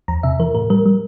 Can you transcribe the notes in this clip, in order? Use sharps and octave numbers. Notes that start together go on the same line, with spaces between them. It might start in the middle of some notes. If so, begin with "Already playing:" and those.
E2 A#5
C3 E5
E3 A#4
A2 A#4
G3 A#4
G3